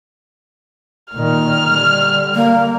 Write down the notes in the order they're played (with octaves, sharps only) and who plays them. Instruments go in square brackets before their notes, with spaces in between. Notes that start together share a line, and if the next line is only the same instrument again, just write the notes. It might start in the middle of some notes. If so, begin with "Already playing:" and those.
[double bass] A#2 D#3 [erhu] F6
[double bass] D3 G3
[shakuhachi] A#3